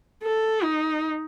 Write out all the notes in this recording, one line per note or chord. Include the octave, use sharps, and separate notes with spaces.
A4
D#4